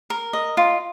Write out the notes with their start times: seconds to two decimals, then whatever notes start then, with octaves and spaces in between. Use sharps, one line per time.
0.10 A#4
0.33 D#5
0.57 F4